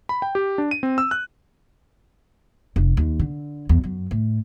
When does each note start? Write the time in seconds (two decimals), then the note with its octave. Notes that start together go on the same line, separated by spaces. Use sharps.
0.09 B5
0.22 G5
0.35 G4
0.58 D4
0.71 D#7
0.83 C4
0.98 E6
1.11 F#6
2.76 F1
2.97 D#2
3.19 D3
3.69 E2
3.83 F#2
4.11 A2